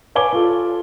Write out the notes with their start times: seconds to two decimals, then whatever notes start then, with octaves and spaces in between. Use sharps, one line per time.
0.15 B4 C#5 G#5 D6 G7
0.33 F4 A4